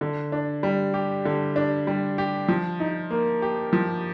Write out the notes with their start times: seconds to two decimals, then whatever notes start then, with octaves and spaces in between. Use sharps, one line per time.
0.01 D3
0.32 D4
0.63 G3
0.94 G4
1.25 D3
1.56 D4
1.87 G3
2.18 G4
2.48 F3
2.80 D#4
3.11 A#3
3.42 G4
3.73 F3